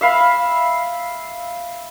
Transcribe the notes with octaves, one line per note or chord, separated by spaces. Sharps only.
E5 F5 B5